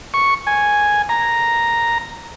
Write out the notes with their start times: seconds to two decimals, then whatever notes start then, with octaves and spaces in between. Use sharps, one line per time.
0.14 C#6
0.47 G#5
1.09 A#5